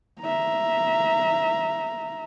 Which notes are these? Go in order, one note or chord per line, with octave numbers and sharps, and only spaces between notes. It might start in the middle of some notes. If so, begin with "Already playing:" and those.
E5 A#5